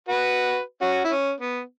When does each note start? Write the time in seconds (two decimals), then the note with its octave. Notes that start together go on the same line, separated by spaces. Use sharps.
0.09 F#4 B4
0.82 C#4 F#4
1.04 E4
1.11 C#4
1.40 B3